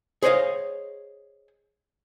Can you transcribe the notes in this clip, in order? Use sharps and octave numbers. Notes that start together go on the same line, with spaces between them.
G#4 C5 C#5 D#5 F5